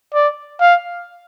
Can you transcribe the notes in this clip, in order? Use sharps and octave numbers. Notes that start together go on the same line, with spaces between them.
D5
F5